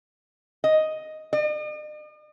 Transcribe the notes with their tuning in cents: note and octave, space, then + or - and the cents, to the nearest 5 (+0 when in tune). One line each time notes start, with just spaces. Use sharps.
D#5 +5
D#5 -45